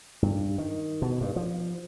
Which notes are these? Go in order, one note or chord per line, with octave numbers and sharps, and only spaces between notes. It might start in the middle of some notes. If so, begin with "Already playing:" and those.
G2
D#3
B2
G2
F3